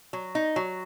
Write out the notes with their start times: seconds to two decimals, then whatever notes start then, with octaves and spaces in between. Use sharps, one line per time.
0.13 F#3
0.35 D#4
0.56 F#3